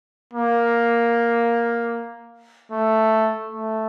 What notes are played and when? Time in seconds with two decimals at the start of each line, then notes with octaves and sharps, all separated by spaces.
0.33 A#3
2.72 A3
3.50 A3